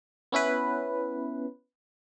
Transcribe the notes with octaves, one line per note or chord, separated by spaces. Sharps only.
B3 C#4 E4 B4